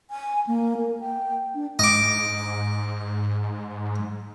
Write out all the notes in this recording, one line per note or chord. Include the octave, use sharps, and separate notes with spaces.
G#5
A#3
A#4
G5
D4
G#2 D#5 D6